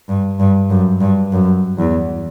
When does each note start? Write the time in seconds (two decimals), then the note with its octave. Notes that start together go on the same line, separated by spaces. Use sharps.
0.09 G2
0.40 G2
0.70 F#2
1.01 G2
1.32 F#2
1.78 E2